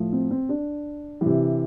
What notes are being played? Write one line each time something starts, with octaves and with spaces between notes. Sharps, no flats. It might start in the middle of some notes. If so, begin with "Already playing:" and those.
Already playing: A2 F3
C4
C4
D4
C3 E3